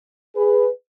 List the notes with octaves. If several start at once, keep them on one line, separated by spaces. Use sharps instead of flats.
G#4 B4